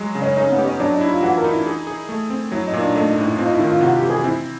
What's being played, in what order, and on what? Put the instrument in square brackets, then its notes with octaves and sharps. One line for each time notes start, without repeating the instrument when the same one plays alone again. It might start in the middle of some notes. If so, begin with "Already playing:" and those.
Already playing: [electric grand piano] F#3 G#3
C#3
[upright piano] C#4
[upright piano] C#4 [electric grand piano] D#4
[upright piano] B3
[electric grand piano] G4
[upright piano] C#4
[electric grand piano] F#3 [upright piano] D4
[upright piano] D#4
[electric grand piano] E4
[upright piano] F4
[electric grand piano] E3 [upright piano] F#4
[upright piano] A#4
[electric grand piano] D#4
[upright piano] E4
[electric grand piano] G#4
G#4
A3
C4
[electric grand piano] F#3 [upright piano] E4
[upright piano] D#4
[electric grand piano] A#2
[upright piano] D4
[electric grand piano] A3 [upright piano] D#4
[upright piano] D#4
[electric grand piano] A2
[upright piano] E4
[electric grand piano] C4 [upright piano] F4
[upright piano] D#4
E4
[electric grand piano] D#3
[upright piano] F4
[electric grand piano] C3 [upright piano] F#4
[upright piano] G4
[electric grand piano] E3
[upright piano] G#4
[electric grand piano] C4 [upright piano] E4